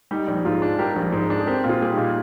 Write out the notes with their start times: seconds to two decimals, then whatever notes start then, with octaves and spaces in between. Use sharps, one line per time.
0.11 G3 D#4 G4
0.28 A#1
0.45 G#2 F4 G#4
0.62 D4
0.78 G3 G4 A#4
0.96 A#1
1.12 G#2
1.30 D4
1.39 G#4
1.46 C4 G4 A#4
1.64 A#2
1.69 F4 G#4
1.81 G3 G#4
1.92 D#4 G4
1.97 A#2